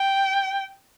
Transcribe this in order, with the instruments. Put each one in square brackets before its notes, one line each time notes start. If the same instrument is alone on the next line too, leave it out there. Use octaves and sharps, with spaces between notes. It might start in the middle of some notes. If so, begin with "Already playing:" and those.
Already playing: [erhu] G5